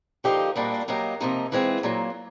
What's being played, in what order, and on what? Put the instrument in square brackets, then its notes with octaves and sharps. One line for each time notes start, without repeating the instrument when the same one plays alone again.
[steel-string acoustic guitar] D3 F3 A#3 D#4 G4
A#2 G3 A#3 D4 F#4
F#3 A#3 D#4 G4 A#4
C3 F3 A#3 D#4
E3 G#3 C4 F4
A#2 F#3 A#3